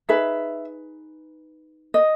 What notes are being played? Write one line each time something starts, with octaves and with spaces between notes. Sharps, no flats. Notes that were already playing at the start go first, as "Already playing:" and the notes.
D#4 G#4 B4 E5
D#5